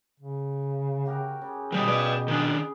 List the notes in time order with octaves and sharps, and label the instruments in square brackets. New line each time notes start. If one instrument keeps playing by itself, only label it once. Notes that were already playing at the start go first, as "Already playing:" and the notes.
[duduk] C#3
[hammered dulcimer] F#4 G4 A#4
C#3
[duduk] B2 [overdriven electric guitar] D#3 G3 [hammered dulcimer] B4 D#5
[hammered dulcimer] G4 D#5 [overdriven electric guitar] B4 D5
[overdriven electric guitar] D#3 D4 [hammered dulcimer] G#4